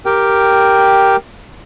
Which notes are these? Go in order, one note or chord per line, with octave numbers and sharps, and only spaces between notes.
G4 A#4 G5